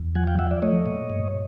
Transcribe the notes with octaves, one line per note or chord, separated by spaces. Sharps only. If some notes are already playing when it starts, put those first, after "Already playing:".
Already playing: E2
F3 F#5 G#5
F5 G5
F3 E5 F#5
D5 E5
A3 C#5 D#5
A#2
G2